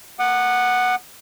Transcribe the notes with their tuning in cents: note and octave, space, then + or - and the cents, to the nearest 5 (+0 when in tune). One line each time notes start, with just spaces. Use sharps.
A#3 -45 F#5 +0 D#6 -40